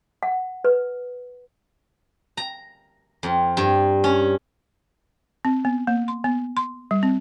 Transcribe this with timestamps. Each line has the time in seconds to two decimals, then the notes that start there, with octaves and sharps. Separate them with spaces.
0.23 F#5
0.64 B4
2.37 A#5
3.23 F2
3.57 G2
4.04 C#4
5.45 C4
5.65 B3
5.87 A#3
6.08 C6
6.24 B3
6.57 C6
6.91 G3
7.03 C4